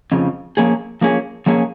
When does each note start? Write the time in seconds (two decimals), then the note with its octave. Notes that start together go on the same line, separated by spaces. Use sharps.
0.12 F2 C#3 F3
0.57 F3 A#3 C#4 G#4
1.01 F3 A#3 C#4 G#4
1.46 F3 A#3 C#4 G#4